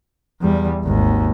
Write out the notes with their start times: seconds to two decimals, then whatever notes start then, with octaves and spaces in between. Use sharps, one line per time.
0.42 E2 G3
0.83 G#1 D#2